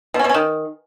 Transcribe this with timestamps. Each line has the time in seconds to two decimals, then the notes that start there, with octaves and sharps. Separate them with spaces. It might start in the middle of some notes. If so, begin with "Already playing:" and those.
0.14 B2
0.19 C#4
0.24 B2
0.29 C#4
0.34 D#3